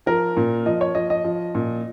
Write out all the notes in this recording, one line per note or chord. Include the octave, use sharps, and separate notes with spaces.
F3 A#4
A#2
F3 D#5
C#5
F3 D#5
D#5
F3
A#2